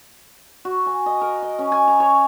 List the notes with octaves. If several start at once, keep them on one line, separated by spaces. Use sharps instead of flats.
F#4
G#5
D#5
A#4
D#5
C#4
G#5
A#5
C#5